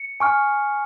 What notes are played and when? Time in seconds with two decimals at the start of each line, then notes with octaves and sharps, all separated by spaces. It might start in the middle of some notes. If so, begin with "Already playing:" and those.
Already playing: C#7
0.20 G#5 C#6 F6